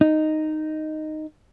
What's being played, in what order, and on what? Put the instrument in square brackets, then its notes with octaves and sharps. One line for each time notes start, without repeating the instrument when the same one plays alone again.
[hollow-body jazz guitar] D#4